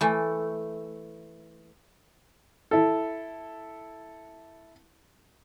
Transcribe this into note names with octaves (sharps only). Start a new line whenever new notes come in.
E3 A3
E4 A4